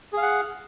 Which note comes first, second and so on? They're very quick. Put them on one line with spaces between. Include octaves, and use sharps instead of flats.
G#4 F5 F#5